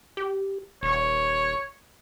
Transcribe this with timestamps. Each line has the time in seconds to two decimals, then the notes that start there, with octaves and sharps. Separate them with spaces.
0.17 G4
0.83 D#1 C#5